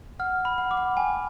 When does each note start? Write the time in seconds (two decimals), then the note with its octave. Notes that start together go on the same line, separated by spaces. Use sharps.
0.19 F#5 F6
0.45 B5
0.58 F#5
0.71 D6
0.77 F#5
0.97 G5 G#5